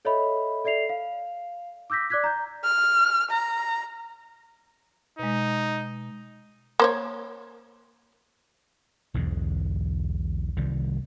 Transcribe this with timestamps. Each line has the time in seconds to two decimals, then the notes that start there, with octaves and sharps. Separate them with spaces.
0.05 A4 C#5 D#5 E5 B5
0.64 A4 D5 E5 C7 F7
0.89 F5
1.90 D6 E6 G6 A#6 B6
2.10 D5 D6 F#6 G#6 B6
2.24 A#5 G6
2.64 F6
3.31 A#5
5.19 B2 G#3 D#4
6.80 A#3 C5 C#5
9.14 B1 E2 G#2 D3
10.57 C2 D#3 G3